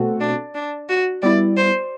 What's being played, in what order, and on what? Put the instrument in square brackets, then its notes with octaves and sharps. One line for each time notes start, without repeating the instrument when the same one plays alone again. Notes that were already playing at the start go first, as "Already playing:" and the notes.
Already playing: [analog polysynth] B2 A3 C4 F#4 A4
[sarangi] D4
D4
F#4
[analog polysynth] G3 B3 E4 [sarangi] D5
[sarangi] C5